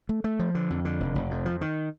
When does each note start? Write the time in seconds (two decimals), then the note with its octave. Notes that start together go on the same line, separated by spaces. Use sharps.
0.09 A3
0.24 A3
0.39 F3
0.55 D3
0.70 F2
0.85 D3
1.00 F1
1.15 F1
1.31 F2
1.46 F3
1.61 D#3